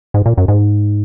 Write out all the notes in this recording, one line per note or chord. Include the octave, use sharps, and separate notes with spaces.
G#2
A#2
F#2
G#2